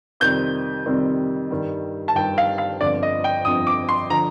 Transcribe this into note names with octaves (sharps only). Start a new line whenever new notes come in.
F2 C3 D#3 G3 C4 G6
F2 C3 D#3 G3 C4
G2 D#3 G3
A5
G2 D#3 G3 G5
F5
F5
G1 F2 D3 F3 D5
D#5
G5
G1 F2 D3 F3 D#6
D6
C6
D3 F3 A#5